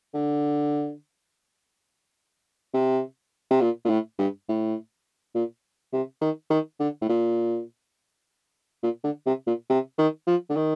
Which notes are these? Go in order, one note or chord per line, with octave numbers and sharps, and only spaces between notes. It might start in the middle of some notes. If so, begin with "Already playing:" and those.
D3
C3
C3
A#2
A#2
A2
G2
A2
A#2
C3
D#3
D#3
D3
A2
A#2
A#2
D3
C3
A#2
C3
D#3
F3
D3
D#3